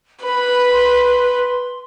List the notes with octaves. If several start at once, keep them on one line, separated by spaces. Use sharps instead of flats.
B4 B5
C6